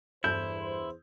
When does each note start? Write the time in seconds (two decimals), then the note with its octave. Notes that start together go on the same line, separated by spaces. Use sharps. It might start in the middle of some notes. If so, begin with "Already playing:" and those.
0.24 E2 G2 E4 A4 C5 A5 G6